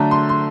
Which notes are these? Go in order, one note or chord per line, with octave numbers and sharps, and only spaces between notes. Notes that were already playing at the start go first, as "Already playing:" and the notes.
Already playing: D3 F#3 A3 D4 A#5
C6
C6